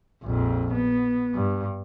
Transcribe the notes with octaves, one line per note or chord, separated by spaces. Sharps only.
A#1 F2
B3
G2